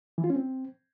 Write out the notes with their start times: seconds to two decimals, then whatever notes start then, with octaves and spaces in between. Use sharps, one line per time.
0.18 E3
0.24 F4
0.30 C#4
0.36 C4